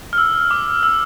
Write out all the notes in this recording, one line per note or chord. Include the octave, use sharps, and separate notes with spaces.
F6
E6
D6
E6